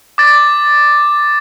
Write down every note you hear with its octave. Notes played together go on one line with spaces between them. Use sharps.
D6 A6